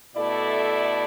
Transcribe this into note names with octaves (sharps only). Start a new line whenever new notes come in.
B2 A3 E4 A4 D5